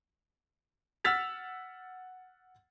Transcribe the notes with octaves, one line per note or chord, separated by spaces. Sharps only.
F#5 E6 F6 A6 B6 F7